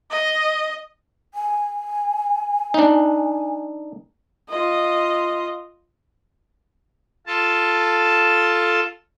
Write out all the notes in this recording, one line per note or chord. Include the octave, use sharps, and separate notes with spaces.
D#5
G#5
D4 D#4
F4 D#5
F4 A4 A5